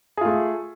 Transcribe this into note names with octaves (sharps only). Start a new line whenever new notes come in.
A3 F4 G#4